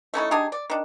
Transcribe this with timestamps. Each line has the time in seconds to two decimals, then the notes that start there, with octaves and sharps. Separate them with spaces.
0.14 A3 C#4 D#4 E4
0.31 D4 D#4 G4 G#4
0.52 D5
0.70 D#3 D4